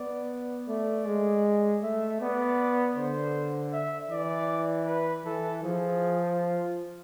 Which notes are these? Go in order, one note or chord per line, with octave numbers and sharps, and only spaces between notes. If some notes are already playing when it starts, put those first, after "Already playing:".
Already playing: B3 D5
A3 D5
G#3
A3 E5
B3 D5
D3 C5
E5
E3 D5
B4
E3 A4
F3 G#4
F4